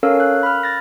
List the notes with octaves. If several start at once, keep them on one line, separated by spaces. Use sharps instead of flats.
C#4 A4 A#4 C#5 F5 E6
F#6
B5 F6
A6 A#6